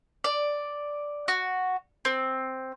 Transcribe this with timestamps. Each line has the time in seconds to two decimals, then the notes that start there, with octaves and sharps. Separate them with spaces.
0.24 D5
1.28 F#4
2.05 C4